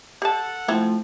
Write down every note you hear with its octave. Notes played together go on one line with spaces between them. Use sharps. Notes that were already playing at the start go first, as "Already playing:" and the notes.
G4 A4 F#5 A5
F3 A3 C4 E4